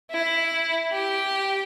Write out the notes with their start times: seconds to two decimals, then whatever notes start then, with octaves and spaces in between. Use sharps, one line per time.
0.12 E4
0.93 G4